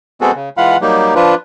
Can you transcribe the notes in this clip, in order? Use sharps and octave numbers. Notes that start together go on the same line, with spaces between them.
G#3 B3 C4 F#4 G#4 A4
C#3
E3 G#3 F4 F5 F#5 B5
F#3 G3 A#3 D#4 G4
F3 D4 F4 B4